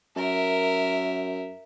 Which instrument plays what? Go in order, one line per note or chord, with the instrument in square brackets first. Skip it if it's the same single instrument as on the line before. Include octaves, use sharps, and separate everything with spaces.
[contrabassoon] F#2 [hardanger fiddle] A#4 E5